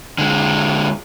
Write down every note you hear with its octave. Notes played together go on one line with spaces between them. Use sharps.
D3 G#3